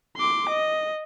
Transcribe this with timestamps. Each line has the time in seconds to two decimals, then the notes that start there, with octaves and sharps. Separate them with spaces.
0.17 C6 D6
0.49 D#5